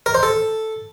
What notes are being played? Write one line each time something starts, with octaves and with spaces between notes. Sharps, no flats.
A#4
C5
A4